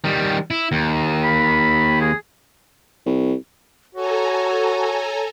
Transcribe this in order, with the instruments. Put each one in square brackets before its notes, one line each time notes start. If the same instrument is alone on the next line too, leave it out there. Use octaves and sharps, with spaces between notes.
[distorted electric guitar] D#3 G3
E4
D#2
[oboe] B5
G#4
[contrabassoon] C2
[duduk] F#4 [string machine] A4 G#5 A#5 [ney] C#5